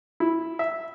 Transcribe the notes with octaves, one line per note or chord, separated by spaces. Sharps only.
E4
E5